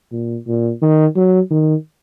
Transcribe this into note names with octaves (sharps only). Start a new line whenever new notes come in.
A#2
A#2
D#3
F#3
D#3